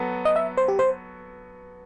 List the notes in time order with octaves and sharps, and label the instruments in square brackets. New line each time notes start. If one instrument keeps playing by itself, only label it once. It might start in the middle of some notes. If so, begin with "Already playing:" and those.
Already playing: [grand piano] F#3 B3 F#4 A4
[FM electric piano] D#5
E5
C5
G4
C5